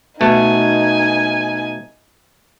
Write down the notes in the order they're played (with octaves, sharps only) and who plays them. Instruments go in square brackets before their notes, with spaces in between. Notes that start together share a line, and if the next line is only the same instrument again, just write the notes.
[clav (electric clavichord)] B2 A3 [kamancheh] D#4 G#5